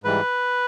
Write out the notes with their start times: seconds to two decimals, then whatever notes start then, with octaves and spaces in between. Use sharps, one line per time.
0.04 G#2 E3 G3 B4